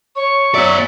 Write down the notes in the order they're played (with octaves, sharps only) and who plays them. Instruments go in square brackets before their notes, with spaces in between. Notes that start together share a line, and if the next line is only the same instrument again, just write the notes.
[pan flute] C#5 [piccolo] C#6
[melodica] F#3 E5 [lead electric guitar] B3 D5